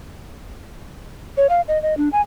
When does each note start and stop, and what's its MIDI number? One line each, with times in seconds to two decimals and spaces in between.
1.37 1.47 73
1.49 1.61 77
1.68 1.81 75
1.82 1.97 75
1.97 2.09 62
2.12 2.21 80